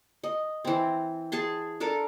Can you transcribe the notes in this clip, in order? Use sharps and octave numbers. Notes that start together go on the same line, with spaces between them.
D#5
E3 C4
G#4 G#5 A5 C6
D4 A4 A#4 A5